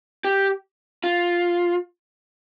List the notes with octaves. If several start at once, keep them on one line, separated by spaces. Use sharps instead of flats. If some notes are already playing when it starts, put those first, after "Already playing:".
G4
F4